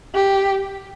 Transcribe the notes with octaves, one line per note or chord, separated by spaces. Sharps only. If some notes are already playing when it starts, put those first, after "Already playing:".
G4